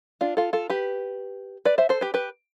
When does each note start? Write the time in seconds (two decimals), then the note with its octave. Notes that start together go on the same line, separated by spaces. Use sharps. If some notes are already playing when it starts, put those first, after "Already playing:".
0.21 D4 F4
0.37 F4 A4
0.53 F4 A4
0.70 G4 B4
1.65 B4 D5
1.78 C5 E5
1.89 A4 C5
2.01 G4 B4
2.14 G4 B4